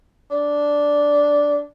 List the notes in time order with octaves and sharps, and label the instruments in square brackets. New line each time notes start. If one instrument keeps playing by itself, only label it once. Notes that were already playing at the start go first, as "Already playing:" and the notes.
[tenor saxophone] D4